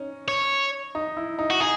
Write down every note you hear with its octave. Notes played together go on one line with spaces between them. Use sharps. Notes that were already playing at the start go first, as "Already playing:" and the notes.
Already playing: C#4 D#4
C#5
D#4
E4
D#4
F#4
D#4 G#4